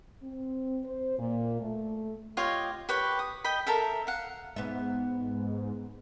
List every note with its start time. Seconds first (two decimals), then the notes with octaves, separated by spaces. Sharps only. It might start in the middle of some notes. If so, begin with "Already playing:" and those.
0.23 C4
0.84 C5
1.18 A#2
1.60 A3
2.37 F4 G4 C#5 D#5
2.89 G4 B4 C#5
3.19 D#6
3.44 D#5 G5 B5
3.67 A4 A#4 E5
4.07 F5 F#5
4.56 G#2 B3 E5